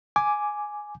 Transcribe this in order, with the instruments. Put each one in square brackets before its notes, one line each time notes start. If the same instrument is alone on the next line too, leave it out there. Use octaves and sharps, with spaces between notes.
[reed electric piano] G#5 D6